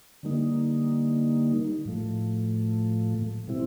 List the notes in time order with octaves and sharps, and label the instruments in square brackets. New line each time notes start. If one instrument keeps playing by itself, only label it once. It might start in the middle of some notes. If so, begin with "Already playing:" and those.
[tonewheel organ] D3 G3 A#3 D#4
A2 F3 A3
B2 G3 C4 E4